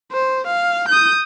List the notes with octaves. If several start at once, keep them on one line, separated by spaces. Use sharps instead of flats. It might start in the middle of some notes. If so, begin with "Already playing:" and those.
C5
F5
D#6 G6